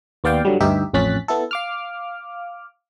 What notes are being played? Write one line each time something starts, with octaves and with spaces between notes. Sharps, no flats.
D#2 B3 D5 F5 G5
G2 D3 F#3 G3
D2 G2 D#4 G4 E5
A1 F2 C#4 F#6 A6 B6
B3 E4 A4
F5 D6 F6